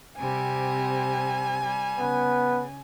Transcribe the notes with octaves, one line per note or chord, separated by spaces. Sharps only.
C3 G3 C4 G#5
G3
C#3 B3